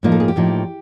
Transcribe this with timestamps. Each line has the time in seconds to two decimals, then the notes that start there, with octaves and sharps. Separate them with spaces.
0.03 A2 F3 A#3 D#4
0.12 A4
0.20 G#4
0.28 G4
0.36 A2 F3 A#3 D#4